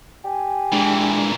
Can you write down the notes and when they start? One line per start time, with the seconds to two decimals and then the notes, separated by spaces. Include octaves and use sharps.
0.25 G4 G#5
0.72 A#2 E3 G#3 D4